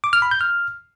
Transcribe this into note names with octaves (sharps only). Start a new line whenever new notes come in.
D6
F6
B5
G6
F6